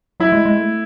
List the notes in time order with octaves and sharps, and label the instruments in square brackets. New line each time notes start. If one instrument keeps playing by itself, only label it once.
[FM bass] F#3 [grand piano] E4
[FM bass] G#3
G#3
A3